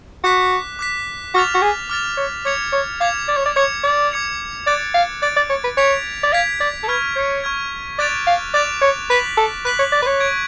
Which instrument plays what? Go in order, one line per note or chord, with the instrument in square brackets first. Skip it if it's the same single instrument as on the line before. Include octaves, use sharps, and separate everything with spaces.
[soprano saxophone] F#4 [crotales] D6 F#6 B6
[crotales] D6 F#6 B6
[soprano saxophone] F#4 [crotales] D6 F6 A6 F7
[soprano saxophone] F#4
G#4
[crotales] D6 F6 A6 F7
[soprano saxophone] C#5
[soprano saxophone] C#5 [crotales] D6 G#6 C#7 F7
[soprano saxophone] C#5
[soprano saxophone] F5 [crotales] D6 G#6 C#7 F7
[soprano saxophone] D5
C#5
D5
[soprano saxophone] C#5 [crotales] D6 G#6 C#7 F7
[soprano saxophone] D5
[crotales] D6 G#6 C#7 F7
[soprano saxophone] D5 [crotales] F#6 A6 D7
[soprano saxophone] F5
[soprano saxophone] D5 [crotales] F#6 A6 D7
[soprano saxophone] D5
C#5
B4
[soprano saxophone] C#5 [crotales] G#6 B6 D7 F7
[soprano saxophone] D5
[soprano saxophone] F5 [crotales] G#6 B6 D7 F7
[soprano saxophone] D5
A4
[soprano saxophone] B4 [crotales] C#6 F6 G#6
[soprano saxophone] C#5
[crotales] C#6 F6 G#6
[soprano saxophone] D5 [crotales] D6 F#6 A6 D7 F7
[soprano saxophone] F5
[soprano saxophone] D5 [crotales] D6 F#6 A6 D7 F7
[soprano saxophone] C#5
[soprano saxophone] B4 [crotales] F#6 B6 F#7
[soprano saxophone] A4
[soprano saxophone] B4 [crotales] F#6 B6 F#7
[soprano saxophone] C#5
D5
B4
C#5
[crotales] C#6 G#6 D7